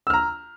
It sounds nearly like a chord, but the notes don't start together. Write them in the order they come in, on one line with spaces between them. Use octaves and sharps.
E6 F6 A#5